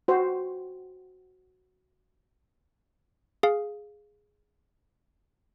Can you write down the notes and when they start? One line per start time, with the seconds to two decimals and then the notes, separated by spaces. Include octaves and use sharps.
0.08 F#4 C5
3.43 G#4 F5